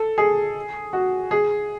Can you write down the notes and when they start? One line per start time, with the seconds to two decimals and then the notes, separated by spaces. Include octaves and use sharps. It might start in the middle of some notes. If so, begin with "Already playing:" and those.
Already playing: A4
0.18 G#4
0.93 F#4
1.31 G#4